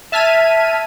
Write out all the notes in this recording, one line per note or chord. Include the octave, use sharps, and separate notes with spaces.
E5 A5 F6 G#6 B6 D#7